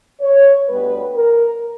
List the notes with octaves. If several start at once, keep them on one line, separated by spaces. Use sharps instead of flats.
C#5
D2 D3 G3 B3 B4
A#4